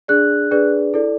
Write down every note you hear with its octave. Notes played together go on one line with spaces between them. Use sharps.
D4 G#4 D5 F#6
D4 G#4 B4 D5
E4 A4 D5